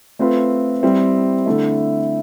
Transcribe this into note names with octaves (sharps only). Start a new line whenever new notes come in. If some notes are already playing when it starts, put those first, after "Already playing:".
A3 C4 F4 B4
G3 C4 E4
D3 A3 E4